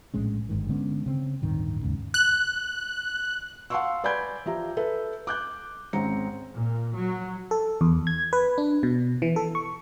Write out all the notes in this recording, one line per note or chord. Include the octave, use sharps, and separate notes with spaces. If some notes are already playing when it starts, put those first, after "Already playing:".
A#1 A2 G#3 C#4
G1 G#2 D#3
D3 G#3 B3 C#4
C#3 C4
D1 G2 D#3
D#2 G#2 C#3
F#6
F5 F#5 A5 C6 C#6 E6
B4 D5 G#5 B5 G6 G#6
F3 G4 E5 A#5
A4 B4 E5
D6 F#6 G6
G#1 G#2 C4 C#4 A#5 C#7
A#2
F#3
A4
E2
G#6
B4
D4
B2
E3
A4
C#6